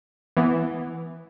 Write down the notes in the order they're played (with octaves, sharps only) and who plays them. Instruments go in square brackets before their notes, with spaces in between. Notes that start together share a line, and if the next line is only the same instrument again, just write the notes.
[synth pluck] E3 B3